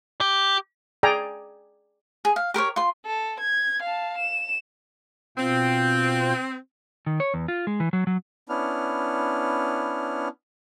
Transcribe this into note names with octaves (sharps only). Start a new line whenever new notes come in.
G4
G#4 D5 G5 G#5 A#5
G#4
F5
G4 A#4 C5 C#5
F4 C6
A4
G#6
F5 A5
E7
B2 C4 F4 G5
D#3
C#5
E2
F4
G#3
E3
F#3
F#3
B3 C#4 D4 E4 F6